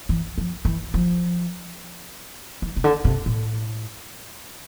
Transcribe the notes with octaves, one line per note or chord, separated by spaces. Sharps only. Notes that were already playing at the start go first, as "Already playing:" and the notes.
E3
F3
E3
F3
E3
C3
D3
C3
A2